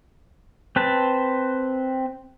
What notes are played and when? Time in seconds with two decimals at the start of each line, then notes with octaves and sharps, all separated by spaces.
0.76 C4 B4 A5